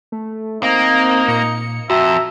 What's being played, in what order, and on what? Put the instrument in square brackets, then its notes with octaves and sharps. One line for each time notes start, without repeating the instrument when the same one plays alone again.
[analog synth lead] A3
[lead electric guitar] A#3 [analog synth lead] C4 [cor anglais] D#4
[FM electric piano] A#2 [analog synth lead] C#7
[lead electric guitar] F2 [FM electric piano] F#4 [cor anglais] E5 [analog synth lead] A#5